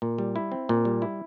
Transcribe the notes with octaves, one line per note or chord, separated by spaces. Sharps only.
A#2
G3
E4
C4
A#2
G3
E4